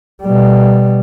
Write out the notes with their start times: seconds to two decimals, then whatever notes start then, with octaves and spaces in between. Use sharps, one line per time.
0.22 B2 G3